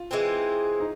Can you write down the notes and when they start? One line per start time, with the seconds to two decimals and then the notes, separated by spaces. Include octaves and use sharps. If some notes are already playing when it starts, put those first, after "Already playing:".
Already playing: F4
0.11 E3 G#3 C4
0.80 D#4